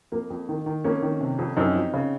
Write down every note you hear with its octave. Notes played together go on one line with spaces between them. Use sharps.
F2 A#3
F2
D#3
D#3
F2 A#3 C#4
D#3
C3
F2
F#2 C4 D#4
F3
C#3